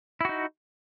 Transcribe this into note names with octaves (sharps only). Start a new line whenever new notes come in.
D#4 E4 F#4